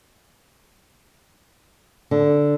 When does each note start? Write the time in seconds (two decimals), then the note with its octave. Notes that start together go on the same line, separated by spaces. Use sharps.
2.11 D3